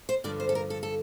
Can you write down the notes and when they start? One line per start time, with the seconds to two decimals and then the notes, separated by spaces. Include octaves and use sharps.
0.09 C5
0.24 G2 D3 F3 D5
0.40 C5
0.49 A4
0.55 A#4
0.70 A4
0.83 A4